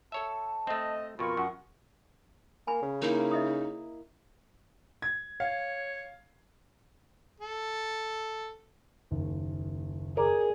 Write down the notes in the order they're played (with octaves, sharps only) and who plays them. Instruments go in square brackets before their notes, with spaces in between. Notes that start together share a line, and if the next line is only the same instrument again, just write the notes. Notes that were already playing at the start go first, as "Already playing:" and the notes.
[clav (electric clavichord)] A4 C#5 E5 [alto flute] A5
[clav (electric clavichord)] A3 C4 [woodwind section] D#5
[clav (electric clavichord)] F2 B2 [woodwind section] F4 A#4 C#6 [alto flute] B5
[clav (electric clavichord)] F#2 [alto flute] F#5
[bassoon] A#3 [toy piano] G#5 B5
[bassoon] C#3
[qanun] A#3 E4 [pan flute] D#4
[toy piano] D#5 E5 D#6
[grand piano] G#6
[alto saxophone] C#5 [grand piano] F5
[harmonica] A4
[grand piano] F#1 D#2
[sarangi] G#4 [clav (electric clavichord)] A#4 D5